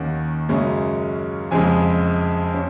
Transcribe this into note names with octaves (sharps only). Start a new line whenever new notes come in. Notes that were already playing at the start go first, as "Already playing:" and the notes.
Already playing: D#2 D#3 A#3 C#4 F#5
F#2 C#3 G#3 C#4
F2 C#3 G#3 G#5
C#4